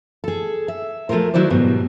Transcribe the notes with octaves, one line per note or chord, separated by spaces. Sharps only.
G#4 A4
E5
F3 A3 F4 G#4 A#4 C5
D#3 F#3 E4 F#4 C5 D5
G#2 B2 F#3 G3